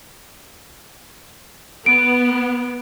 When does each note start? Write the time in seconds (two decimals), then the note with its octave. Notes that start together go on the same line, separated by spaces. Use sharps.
1.86 B3 D7